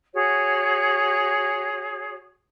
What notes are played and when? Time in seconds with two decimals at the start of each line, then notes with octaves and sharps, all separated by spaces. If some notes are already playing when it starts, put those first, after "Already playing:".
0.13 F#4 G#4 C#5